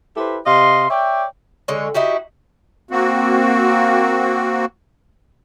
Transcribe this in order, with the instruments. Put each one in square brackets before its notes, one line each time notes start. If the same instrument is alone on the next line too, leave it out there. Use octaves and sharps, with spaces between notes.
[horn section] E4 G4 A4 B4 C5
C3 D#5 F5 C6
C#5 D5 E5 G5
[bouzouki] D3 G#3 C#5
D#4 E4 F#4 G4
[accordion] A#3 C4 F#4